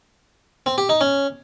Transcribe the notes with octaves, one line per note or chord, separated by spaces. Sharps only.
C4
G4
D#4
C#4